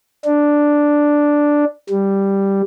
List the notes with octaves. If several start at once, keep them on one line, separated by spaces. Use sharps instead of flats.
D4
G3